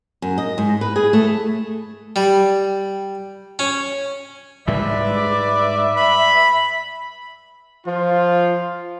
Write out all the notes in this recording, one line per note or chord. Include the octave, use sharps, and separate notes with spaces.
F#2
D#5
G#2
B4
G#4
A3
G3
C#4
G#2 G3 G#3 B4 D5 E5
B5
F3 F4